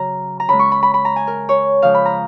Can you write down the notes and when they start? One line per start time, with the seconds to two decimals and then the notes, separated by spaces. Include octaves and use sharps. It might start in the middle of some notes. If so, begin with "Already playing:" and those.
Already playing: C#3 F#3 A#5
0.40 A#5
0.49 C#3 G#3 B5
0.59 C#6
0.72 B5
0.83 B5
0.94 B5
1.05 A#5
1.16 G#5
1.27 A#4
1.49 C#5
1.82 C#3 F3 G#3 F5
1.95 B5
2.06 A#5